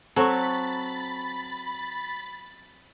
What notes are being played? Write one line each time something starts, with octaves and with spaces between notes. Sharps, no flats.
F#3 C4 A4 B5 C#6 A6